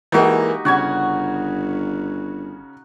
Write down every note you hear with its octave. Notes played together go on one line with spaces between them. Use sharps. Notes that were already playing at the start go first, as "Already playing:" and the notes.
E3 G#3 A#3 D#4 F#4 G4
G1 C#3 C#4 C#5 F#5 G#6